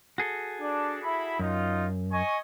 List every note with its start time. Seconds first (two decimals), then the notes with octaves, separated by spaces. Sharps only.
0.18 F#4 G#4 A4
0.59 D4
1.03 E4 E5 B5
1.39 F#2 D#4 F4
2.11 D#5 G#5 C#6